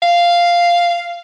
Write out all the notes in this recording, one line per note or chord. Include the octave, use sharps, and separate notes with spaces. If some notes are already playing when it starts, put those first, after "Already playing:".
F5